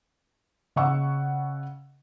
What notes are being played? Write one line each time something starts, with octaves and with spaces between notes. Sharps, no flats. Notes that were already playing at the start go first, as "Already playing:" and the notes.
C#3 D#5 F#5 C#6 E6